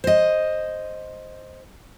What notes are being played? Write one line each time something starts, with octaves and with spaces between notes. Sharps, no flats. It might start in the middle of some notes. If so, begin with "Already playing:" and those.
C5 D#5